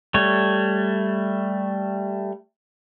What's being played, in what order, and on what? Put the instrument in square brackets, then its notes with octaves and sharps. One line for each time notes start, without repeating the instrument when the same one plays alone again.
[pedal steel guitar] G3 A3 C#5